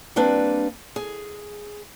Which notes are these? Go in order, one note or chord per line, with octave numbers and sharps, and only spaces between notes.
G3 A#3 C4 D4 B4
G#4